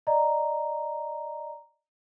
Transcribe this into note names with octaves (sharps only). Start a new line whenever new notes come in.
D5 D#5 A#5